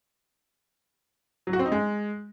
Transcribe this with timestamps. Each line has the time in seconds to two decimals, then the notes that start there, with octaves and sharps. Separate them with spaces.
1.47 F#3
1.53 F#4
1.59 C4
1.66 D#4
1.72 G#3